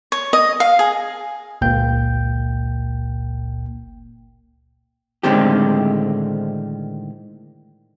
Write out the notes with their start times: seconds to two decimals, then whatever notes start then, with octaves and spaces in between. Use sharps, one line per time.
0.12 C#5
0.33 D#5
0.60 F5
0.79 G#4
1.61 G1 C#2 A#2 A#3 G5 G6
5.23 A2 D3 D#3 G#3 C4 G4